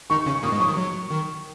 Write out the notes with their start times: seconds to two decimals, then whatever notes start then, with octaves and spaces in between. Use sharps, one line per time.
0.10 D#3 D#4 C#6
0.26 C#3 C#4
0.35 C#6
0.43 A#2 A#3 D#6
0.52 G#2 G#3
0.60 F#3 C#6
0.68 D#3
0.77 F#3
1.11 D#3